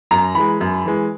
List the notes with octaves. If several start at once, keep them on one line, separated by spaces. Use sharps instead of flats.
F#2 A#5
E3 G#3 B5
F#2
E3 G#3